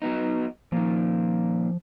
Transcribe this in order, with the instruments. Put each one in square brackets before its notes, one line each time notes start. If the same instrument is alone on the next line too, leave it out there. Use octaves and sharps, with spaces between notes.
[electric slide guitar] F#3 B3 D#4
[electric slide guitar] A#2 D#3 [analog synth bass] F3